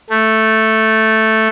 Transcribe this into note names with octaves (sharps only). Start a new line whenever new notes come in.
A3